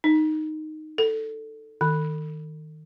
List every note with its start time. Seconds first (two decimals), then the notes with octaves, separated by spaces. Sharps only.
0.04 D#4
0.98 A4
1.81 D#3